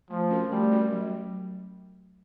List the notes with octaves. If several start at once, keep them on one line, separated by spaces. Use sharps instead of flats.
F3 A3
C#4 F#4 A#4
G3 A3
C#4 F#4 A#4
F#3